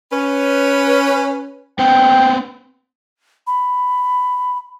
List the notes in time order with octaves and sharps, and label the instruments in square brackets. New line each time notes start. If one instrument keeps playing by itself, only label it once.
[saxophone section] C#4 B4
[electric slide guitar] B3 C4 [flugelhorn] G5
[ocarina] B5